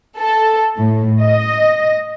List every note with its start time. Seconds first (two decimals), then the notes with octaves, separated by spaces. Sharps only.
0.20 A4
0.77 A2
1.20 D#5